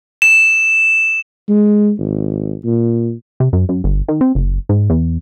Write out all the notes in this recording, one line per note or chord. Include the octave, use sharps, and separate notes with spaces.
E7
G#3
G#1
A#2
C3
F#2
F#2
G1
D#3
C4
F#1
G#2
E2